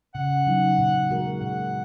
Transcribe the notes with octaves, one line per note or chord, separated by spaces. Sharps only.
C#3 F#5
F#3 D#4
A#2
G#3 F#4 A#4
A#2 F#5